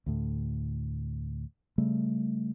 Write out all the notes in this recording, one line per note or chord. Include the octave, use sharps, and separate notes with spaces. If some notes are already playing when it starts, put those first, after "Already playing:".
D2 A2
C#3 G3 A3